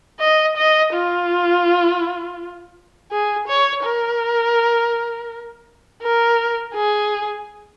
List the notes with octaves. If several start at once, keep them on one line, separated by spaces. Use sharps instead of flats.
D#5
D#5
F4
G#4
C#5
A#4
A#4
G#4